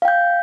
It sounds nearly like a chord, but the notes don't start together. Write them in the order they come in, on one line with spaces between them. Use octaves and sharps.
F5 G5 G6